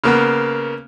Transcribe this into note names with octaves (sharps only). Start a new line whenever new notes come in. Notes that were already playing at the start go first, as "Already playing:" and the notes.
C#3 A#3 B3